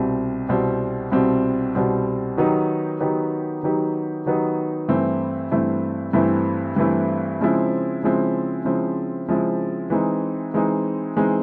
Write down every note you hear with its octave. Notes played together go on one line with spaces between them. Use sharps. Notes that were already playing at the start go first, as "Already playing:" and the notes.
Already playing: C2 B2 G3 C4
C2 B2 G3 C4
C2 B2 G3 C4
C2 B2 G3 C4
D#3 F#3 B3 D#4 G4
D#3 F#3 B3 D#4 G4
D#3 F#3 B3 D#4 G4
D#3 F#3 B3 D#4 G4
G2 E3 A3 C4 E4
G2 E3 A3 C4 E4
G2 E3 A3 C4 E4
G2 E3 A3 C4 E4
C#3 F3 G#3 C4 E4
C#3 F3 G#3 C4 E4
C#3 F3 G#3 C4 E4
C#3 F3 G#3 C4 E4
E3 G#3 C4 D#4
E3 G#3 C4 D#4
E3 G#3 C4 D#4